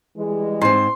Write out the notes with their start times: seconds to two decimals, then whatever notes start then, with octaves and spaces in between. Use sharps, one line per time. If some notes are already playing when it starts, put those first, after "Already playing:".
0.18 E3 G3 G#3
0.61 G#2 C4 C6